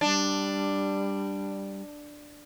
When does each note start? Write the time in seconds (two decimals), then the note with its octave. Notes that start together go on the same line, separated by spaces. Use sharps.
0.01 G3 D4